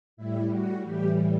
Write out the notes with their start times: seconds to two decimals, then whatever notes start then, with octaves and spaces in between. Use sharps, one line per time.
0.17 A2 G3 E4
0.50 F#4
0.83 A2 E3 G3 G4